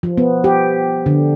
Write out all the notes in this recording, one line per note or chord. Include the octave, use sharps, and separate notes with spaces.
F3
B3
G4
D3